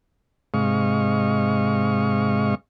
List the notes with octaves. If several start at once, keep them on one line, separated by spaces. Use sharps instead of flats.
G#2 C3 G#3 D#5 F5 C#6